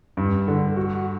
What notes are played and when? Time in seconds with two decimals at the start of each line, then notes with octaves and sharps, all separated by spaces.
0.17 G2
0.48 D3
0.77 F#4